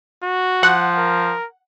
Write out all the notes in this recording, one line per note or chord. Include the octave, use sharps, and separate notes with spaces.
F#4
F3 F#5
A#4